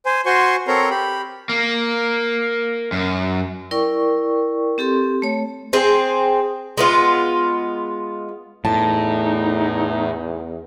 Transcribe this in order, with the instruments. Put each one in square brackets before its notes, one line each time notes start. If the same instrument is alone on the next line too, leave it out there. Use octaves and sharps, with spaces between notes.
[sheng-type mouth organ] C5 G#5
F#4 C5 G#5 C6 C#6
C4 A4 A#4 C#5 A#5 C6
G4 B5
[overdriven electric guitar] A#3
F#2
[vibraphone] E4 A#4 D5 G5 C#6
C4 G4 A4 C6
A3 C#5
[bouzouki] C4 G#4
G#3 B3 F4
[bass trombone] E2 [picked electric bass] A2 [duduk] D#4 [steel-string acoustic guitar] A5